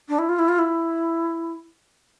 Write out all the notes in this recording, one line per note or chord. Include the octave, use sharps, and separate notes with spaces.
D4
E4
F4
E4
F4
E4